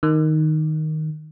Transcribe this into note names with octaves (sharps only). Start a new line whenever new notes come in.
D#3